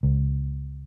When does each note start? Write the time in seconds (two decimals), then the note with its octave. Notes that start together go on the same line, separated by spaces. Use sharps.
0.03 C#2